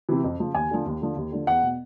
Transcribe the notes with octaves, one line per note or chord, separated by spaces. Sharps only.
C3 E3
F2
C#3 F3
D#2 G#5
D3 F3
D#2
D3 F3
D#2
D3 F3
E2 F#5
B2